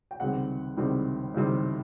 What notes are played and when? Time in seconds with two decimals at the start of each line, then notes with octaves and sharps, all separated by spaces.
0.11 G5
0.20 C#2 C3 D#3 G3 C4 F#5
0.77 C#2 C3 D#3 G3 C4
1.34 C#2 C3 D#3 G3 C4